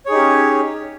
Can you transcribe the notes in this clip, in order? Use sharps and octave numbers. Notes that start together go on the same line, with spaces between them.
C#4 D#4 G4 G#4 C#5